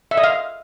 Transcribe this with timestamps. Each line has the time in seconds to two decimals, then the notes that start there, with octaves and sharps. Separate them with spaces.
0.11 E5
0.17 D#5
0.24 F5